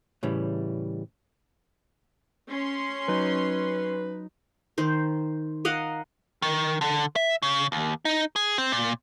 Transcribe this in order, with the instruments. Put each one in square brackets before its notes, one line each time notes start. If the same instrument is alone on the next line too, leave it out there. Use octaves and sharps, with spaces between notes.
[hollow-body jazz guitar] A2 C#3 E3 G3
[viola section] C#4 C6
[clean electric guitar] F#3 D#4 [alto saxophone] B4
[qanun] D#3 C5
A#4 D#5 F5 F#5
[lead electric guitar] D#3
D3
E5
C#3
D#2
D#4
G#4
C4
A#2